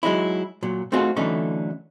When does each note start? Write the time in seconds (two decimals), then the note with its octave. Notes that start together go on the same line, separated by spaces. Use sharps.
0.03 F#3 G#3 D#4 E4
0.63 A#2 F#3
0.92 A3 C4 D#4 F4 F#4 G#4
1.17 D3 E3 F#3 A3 C#4 D#4